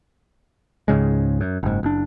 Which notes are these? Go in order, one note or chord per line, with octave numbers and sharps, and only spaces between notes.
C#2 G#2 C#3 G#3
F#2
F#1 G#2
F#1 D4